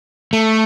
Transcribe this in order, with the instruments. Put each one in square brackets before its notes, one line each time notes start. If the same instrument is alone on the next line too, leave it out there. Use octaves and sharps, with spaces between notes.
[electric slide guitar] A3